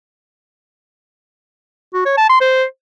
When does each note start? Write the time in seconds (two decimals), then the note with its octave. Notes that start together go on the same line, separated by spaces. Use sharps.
1.94 F#4
2.06 C#5
2.17 A5
2.29 C6
2.41 C5